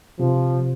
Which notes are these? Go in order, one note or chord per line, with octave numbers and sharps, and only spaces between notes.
C3 F3